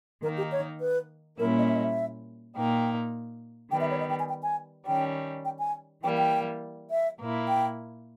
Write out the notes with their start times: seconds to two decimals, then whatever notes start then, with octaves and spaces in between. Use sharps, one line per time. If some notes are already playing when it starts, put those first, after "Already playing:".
0.22 D#3 A#3 D#4 A#4
0.37 G4
0.52 C#5
0.80 B4
1.38 A#2 G3 A#3 C#4 E4 A#4
1.58 D#5
1.68 E5
1.76 D#5
1.84 E5
2.55 A#2 A#3 D#4 G5
3.71 D#3 G3 B3 G5
3.80 E5
3.90 C#5
4.00 D#5
4.10 G5
4.19 G#5
4.29 G5
4.43 G#5
4.86 D#3 G3 C#4 G5
5.45 G5
5.59 G#5
6.03 E3 G3 A#3 G5
6.18 G5
6.90 E5
7.19 A#2 A#3 E4
7.48 G5